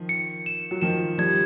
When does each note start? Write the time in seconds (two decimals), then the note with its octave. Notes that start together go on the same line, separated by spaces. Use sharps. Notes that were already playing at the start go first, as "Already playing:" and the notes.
Already playing: D#3 F3
0.09 C#7
0.46 E7
0.71 F#3
0.82 D#3 F3 E7
1.18 F3 G3 G#6